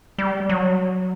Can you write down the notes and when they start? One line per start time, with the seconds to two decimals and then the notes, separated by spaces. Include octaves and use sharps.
0.18 G3
0.49 F#3